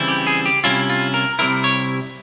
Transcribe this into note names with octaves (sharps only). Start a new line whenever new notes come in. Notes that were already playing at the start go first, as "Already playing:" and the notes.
Already playing: C#3 E3 G3 C4 E4
G4
G#4
G4
C3 G3 C#4 E4 F4
F4
A#4
C3 G3 C4 E4 A#4
C#5